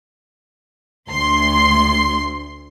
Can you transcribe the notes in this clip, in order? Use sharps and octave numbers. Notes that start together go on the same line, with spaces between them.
D2 C6